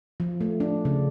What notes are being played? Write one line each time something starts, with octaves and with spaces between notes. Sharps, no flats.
F3
A3
D4
C#3